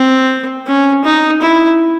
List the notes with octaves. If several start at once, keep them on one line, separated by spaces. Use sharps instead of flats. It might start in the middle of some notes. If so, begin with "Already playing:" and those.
Already playing: C4
C#4
D#4
E4